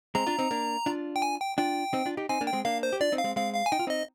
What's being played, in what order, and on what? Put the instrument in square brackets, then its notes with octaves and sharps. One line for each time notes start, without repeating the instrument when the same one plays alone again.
[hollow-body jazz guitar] G#3 C4 [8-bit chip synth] A#5
[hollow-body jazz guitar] D4 F4
C4 D#4
A#3 D4
D4 F4
[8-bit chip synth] G5
G#5
G5
[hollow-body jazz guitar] D4 F4 [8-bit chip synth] G5
[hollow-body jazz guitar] C4 D#4
D4 F4
D#4 G4
[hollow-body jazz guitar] C4 D#4 [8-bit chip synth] G#5
[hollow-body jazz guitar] A#3 D4
[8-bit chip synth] G5
[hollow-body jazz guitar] G#3 C4
[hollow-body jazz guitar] A#3 D4 [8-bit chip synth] F5
[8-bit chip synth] C5
[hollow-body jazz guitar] G4
[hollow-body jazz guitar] D4 F4 [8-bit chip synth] D5
[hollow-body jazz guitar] C4 D#4
[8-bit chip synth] F5
[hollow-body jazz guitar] G#3 C4
[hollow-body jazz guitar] G#3 C4 [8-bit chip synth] F5
[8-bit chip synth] F5
G#5
[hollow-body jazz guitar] D#4 [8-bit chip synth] G5
[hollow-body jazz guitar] F4
[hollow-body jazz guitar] C4 D#4 [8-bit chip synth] D#5